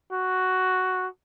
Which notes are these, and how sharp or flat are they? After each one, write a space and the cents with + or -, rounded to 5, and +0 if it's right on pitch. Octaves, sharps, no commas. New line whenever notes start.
F#4 +5